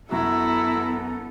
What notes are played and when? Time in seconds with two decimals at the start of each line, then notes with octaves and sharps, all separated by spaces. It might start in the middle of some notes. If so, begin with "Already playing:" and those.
0.11 F#2 B3 E4 F#4 A4 A#5